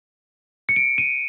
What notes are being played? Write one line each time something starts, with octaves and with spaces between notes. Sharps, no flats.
C#7
D7
D#7